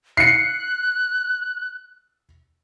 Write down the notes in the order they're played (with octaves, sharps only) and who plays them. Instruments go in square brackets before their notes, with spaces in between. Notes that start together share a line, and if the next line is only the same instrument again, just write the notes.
[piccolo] F#6 [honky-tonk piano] C7 C#7